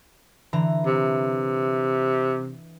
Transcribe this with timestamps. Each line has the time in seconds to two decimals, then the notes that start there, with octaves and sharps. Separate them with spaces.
0.53 D3 E3 A#5
0.86 C3